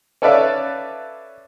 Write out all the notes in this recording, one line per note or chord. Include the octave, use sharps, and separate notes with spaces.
C#4 A4 B4 D5 E5 F5